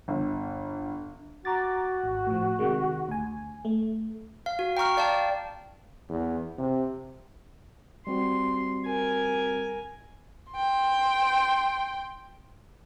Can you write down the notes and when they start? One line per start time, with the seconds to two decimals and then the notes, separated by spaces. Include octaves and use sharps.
0.08 G1
1.45 F#4 A#5 D6 A6
2.04 G#1
2.27 A2 F3
2.59 C3 D#3 G#3
3.09 D2 G#5
3.65 A3
4.46 F5
4.59 F#4
4.77 G5 A#5 C#6 F6
4.97 D5 F5 G5 A5
6.09 E2
6.58 C3
8.07 G3 C4 F#4 C6
8.85 A#4 G#5
10.52 G5 C6